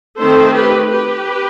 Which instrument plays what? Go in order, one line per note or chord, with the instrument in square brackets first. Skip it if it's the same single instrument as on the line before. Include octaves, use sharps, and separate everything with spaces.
[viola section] D#3 A3 C4 A4 C5
G4 B4
G4 B4